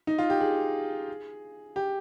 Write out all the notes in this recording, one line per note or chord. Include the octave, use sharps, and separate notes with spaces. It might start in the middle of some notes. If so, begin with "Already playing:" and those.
D#4
F4
G4
G#4
G4